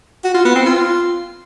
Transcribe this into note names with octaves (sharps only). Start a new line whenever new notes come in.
F#4
F4
B3
C4
F4